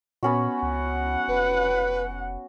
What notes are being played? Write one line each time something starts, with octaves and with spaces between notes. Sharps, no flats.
A#2 B3 C#4 F#4
C#2 F#5
F1 B4